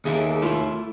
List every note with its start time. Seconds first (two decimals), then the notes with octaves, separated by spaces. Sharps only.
0.05 D#2 G#4 A4 E5
0.42 A3 E4 F4